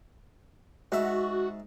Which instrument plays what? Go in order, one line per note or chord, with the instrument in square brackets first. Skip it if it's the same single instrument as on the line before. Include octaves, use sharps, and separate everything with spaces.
[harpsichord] G#2 E5 [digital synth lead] F#4